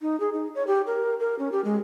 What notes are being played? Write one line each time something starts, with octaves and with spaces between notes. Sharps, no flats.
D#4
G#4
D#4
C#5
G4
A#4
A#4
C#4
G4
G#3